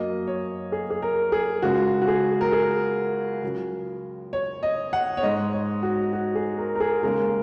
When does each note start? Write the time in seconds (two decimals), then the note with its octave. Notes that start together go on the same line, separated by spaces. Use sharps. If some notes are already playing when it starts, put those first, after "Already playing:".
Already playing: F#2 F#3 A#3 D#5
0.27 C#5
0.72 G#4
0.90 G#4
1.02 A#4
1.32 G#4
1.62 C#2 C#3 G#3 F#4
2.02 F#4
2.08 G#4
2.41 A#4
2.52 G#4
3.42 C#2 C#3 F#3
4.33 C#5
4.63 D#5
4.93 F#5
5.17 C#5
5.23 G#2 G#3 D#5
5.53 C#5
5.83 F#4
6.13 F#4
6.35 G#4
6.58 A#4
6.75 A#4
6.80 G#4
7.03 D#2 C#3 G#3 A#4